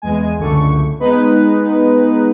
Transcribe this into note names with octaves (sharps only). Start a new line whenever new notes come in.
E2 G#3 G#5
C#2 F#2 D3 A3 C#6
G#3 B3 D#4 B4